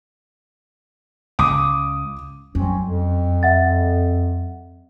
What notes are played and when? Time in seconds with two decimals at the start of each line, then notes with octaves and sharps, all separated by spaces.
1.39 C#2 D6 D#6
2.55 F#2 G3 C4 C#4
2.83 F2
3.43 E5 F#5 A6